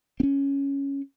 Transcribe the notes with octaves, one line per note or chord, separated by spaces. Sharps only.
C4 C#4